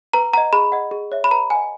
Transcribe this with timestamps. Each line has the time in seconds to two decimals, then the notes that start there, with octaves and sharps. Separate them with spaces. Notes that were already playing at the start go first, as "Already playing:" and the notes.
0.14 B4 A#5
0.34 D#5 F#5 A#5
0.53 G#4 B5
0.72 D#5 F#5
0.91 G#4
1.12 C#5 E5
1.24 B5
1.31 B4 A#5
1.50 D#5 F#5 G#5